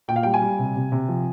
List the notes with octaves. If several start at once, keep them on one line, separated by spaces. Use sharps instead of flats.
A#2 G5
F5
G3 G5
G#5
G3
C3
C3
C3
F3